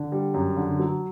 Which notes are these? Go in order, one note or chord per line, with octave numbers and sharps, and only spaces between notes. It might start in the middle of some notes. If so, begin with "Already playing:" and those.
Already playing: D3
G3
F#2
D3
F#3